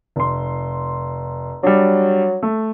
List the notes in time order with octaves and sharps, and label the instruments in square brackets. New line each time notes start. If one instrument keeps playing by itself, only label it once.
[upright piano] F1 C6
[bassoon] F#3 [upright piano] G3 D4
[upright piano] A3